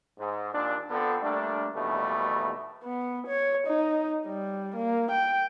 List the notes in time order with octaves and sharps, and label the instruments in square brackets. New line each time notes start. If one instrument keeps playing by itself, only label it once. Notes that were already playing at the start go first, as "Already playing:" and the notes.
[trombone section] G#2
D#2 A#2 D4
D3 B3 C4 F4 A4
G3 A3 A#3 D4
D#2 B2 E3 G3 A3
[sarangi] B3
C#5
D#4
G3
A#3
G5